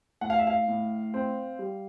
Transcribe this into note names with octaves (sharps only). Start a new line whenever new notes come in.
A2 F#5
F5
E5
F5
A2
C4
G3